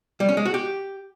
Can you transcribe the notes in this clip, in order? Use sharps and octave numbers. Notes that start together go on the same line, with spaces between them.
G3
C#4
G#3
F#4
G4